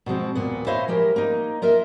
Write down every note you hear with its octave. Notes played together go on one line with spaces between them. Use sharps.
B2 F3 G#3 C4
D#2 A#2 B3
E4 C5 C#5 D#5 F5
F3 G#3 G4 A#4
A#3 D#4
F4 A#4 D#5 E5